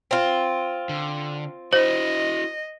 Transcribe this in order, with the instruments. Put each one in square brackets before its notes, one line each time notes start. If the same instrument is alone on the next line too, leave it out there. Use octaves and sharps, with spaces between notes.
[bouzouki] C4 F4
[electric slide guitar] D3
[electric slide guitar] E4 F#4 [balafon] C5 [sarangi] D#5